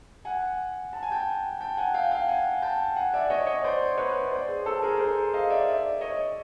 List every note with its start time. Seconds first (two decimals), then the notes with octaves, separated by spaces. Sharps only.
0.25 F#5 G#5
0.93 A5
1.03 G#5
1.12 G5 A5
1.61 G5 A5
1.77 F#5 G#5
1.94 F5 G5
2.11 F5 G5
2.28 F#5 G#5
2.62 G5 A5
2.96 F#5 G#5
3.14 D5 E5
3.30 C#5 D#5
3.47 C#5 D#5
3.64 C5 D5
3.98 B4 C#5
4.31 C5 D5
4.48 G#4
4.66 A4
4.82 G#4 A#4
4.99 A#4 C5
5.34 D#5 F5
5.50 D5 E5
5.67 D5 E5
6.01 C#5 D#5